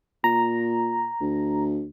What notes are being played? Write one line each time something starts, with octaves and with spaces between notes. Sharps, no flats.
A#2 A#5
D2